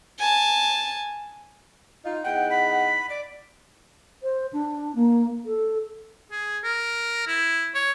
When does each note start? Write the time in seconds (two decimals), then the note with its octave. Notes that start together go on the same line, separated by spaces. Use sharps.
0.19 G#5 A5
2.05 D#4 F4
2.24 E2 D#4 F#5 G5
2.50 B5
3.10 D5
4.23 C5
4.53 D4
4.95 A#3
5.46 A4
6.32 G#4
6.64 A#4
7.27 E4
7.75 C#5